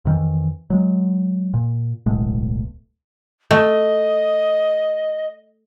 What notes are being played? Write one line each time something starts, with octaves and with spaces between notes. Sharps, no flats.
F2 D#3 E3
F#3 G#3
A#2
D1 B1 A2 G#3
A3 D#5